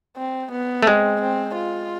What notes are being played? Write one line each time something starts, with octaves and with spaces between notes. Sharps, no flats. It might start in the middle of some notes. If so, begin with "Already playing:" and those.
C4
B3
A3
G#3 C4
C4
F4